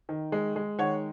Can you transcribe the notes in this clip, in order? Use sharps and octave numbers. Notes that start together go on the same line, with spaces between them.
D#3
G#3
G#3
D#3 C#5 F#5